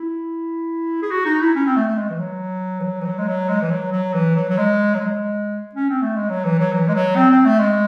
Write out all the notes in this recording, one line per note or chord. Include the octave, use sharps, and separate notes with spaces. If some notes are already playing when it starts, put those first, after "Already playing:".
Already playing: E4
G#4
F#4
D#4
E4
C#4
C4
A3
A3
G#3
E3
F#3
E3
F#3
E3
F#3
G#3
F#3
G#3
E3
F#3
F#3
E3
F#3
F#3
G#3
F#3
G#3
C#4
C4
A3
G#3
F#3
E3
F#3
E3
G#3
F#3
C4
C4
A3
G#3